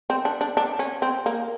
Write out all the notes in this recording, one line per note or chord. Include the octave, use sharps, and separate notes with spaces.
C4
D4
D4
D4
C#4
C4
A#3